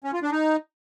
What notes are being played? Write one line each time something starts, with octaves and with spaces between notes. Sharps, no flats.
C#4
F4
D4
D#4